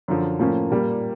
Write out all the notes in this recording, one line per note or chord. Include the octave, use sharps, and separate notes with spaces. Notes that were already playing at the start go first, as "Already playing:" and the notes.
F#2 D3 F3
A2 F3 A#3 C#4
A#2 G3 A#3